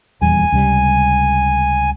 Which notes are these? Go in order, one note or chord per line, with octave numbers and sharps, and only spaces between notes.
D#1 E2 G3 G#5
C#2 C3 G3